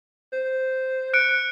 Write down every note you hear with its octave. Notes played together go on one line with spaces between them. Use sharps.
C5
F#6 C#7 D7